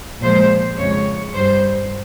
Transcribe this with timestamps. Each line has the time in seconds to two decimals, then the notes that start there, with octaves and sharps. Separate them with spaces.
0.22 A#2 F3 G#3 C5
0.78 F2 C#3 G#3 C#5
1.35 G2 G3 C5